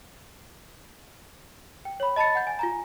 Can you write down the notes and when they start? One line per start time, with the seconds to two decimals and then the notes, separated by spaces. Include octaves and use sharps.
1.85 G5
2.00 C#5 B5
2.16 D#5 A5 B5 A6 C#7
2.35 F#5 G6
2.47 G#5
2.59 F4 G#5 A#5